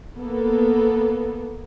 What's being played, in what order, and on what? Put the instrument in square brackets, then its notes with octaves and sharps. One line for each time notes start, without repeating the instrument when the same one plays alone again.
[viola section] A#3 B3 A4